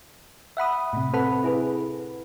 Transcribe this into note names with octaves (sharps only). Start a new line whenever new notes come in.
E5 F#5 B5 D#6
A2 C3
C4 A4 B4 F#5 B5
E4 G#4 B4